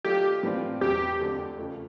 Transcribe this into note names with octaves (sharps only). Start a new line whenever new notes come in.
D#3 F#3 A3 D4 F4 G4
A2 E3 G3 C4 F4
E2 B2 F#3 G4
F2 D3 F#3 A3
C#3 F3 A3